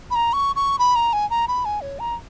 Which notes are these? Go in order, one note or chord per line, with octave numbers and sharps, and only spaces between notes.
B5
A#5
C#6
C#6
B5
A#5
G#5
A#5
B5
G#5
C#5
A#5